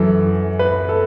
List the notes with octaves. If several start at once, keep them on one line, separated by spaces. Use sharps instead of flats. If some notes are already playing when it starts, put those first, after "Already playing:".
Already playing: F#2 E3 A4
B4
A4